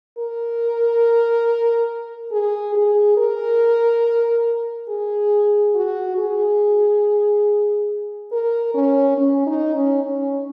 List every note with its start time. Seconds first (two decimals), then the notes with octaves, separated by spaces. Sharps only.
0.18 A#4
2.32 G#4
2.75 G#4
3.17 A#4
4.89 G#4
5.75 F#4
6.18 G#4
8.32 A#4
8.75 C#4
9.17 C#4
9.46 D#4
9.75 C#4
10.03 C#4